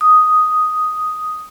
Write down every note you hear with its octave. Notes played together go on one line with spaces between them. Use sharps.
D#6